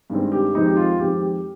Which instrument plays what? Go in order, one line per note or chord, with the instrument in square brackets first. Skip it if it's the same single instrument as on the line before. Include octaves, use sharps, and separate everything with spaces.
[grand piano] G2 D#3 G#3 C4
G4
F2 D#3 G#3 C4 D#4
G4
F4
F2 D#3 G#3 C4 G4
G4